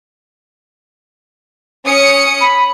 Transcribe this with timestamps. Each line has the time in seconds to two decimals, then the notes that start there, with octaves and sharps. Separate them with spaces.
1.86 C#4 D#6 C#7
2.40 B5